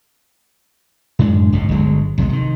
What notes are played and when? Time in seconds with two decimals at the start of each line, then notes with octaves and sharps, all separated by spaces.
1.19 F#2 A2 G#3 D4
1.52 G#1 C#2 B2
1.69 G1 D2 F#3 G#3
2.18 B1 C3 F#3 G#3
2.29 C3 D#3